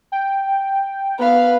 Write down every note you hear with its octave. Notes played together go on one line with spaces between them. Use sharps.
G5
B3 B4 F5